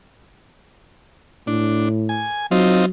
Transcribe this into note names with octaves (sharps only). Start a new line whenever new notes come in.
A2 D4
G#5
F#3 C4 D#4 F4